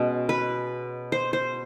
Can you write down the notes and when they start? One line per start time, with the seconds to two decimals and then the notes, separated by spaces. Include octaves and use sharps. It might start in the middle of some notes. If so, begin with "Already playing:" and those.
Already playing: B2 G#3 C#4
0.29 B4
1.12 C5
1.33 C5